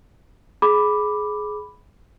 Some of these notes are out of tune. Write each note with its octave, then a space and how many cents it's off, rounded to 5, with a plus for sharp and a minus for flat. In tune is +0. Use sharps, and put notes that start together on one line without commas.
G#4 +20 B5 +0 D6 +0